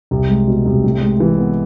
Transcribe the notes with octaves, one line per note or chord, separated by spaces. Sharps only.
C2
G#3
B2
C2
A2
G#3
E3
B3